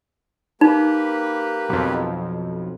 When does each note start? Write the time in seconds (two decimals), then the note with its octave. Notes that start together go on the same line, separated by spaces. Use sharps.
0.61 A#3 D#4 G4 B4
1.69 B1 F2